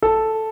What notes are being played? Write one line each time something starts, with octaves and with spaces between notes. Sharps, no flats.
A4